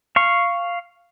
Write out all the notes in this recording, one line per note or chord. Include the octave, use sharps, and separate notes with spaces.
F5 C#6